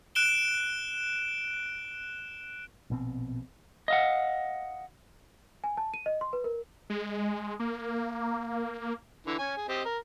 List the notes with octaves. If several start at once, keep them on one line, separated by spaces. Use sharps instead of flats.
F#6 D7 E7 G7
A#1 B2 C4
D#5 F5 F#5
G#5
A5
D#7
D#5
C6
B4
A#4
G#3
A#3
D3 E3
C#4 G#5
G#4
C4 G4 D#5
A#4